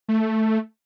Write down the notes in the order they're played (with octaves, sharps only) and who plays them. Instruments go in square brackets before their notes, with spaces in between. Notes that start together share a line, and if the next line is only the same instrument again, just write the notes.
[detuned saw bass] A3